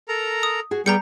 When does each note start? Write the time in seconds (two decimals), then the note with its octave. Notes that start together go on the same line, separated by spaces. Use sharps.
0.09 A4 A#4 A#5
0.43 D#6
0.71 F#4 G#4
0.86 G3 B3 G#4 G5 A#5 G6 C#7